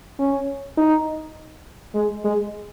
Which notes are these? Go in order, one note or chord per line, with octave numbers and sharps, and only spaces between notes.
C#4
D#4
G#3
G#3